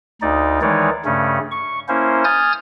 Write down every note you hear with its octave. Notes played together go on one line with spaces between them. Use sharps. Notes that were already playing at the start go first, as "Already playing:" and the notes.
D2 D#4 D5
D#3 E3 G#3 D#4 C#5 D5
G2 C#3 A3 C#4
C#6
A#3 C#4 E4 C5
G#5 D#6 F6 G6 A6